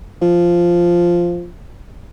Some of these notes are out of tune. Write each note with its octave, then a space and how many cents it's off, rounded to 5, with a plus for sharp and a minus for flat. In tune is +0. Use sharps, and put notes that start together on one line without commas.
F3 -5